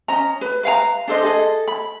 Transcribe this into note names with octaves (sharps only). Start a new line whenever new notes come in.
C#4 D#5 A#5
B4
B4 F5 F#5 A#5
D4 A4 C5 D#5
G#4 A4 D#5
B5